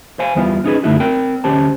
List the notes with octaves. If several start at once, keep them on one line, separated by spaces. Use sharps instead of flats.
C5 F5 G#5
E2 G3 B3 D4 E4 F4
B3 C#4 D#4 E4 G#4 B4
F#2 D3 A3 D#4 E4 F#4
C4 A#4 G5
D2 C#4 G4 C5 A5